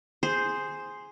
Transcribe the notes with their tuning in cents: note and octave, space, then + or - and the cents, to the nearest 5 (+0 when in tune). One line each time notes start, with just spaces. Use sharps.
G#4 -5 C5 +0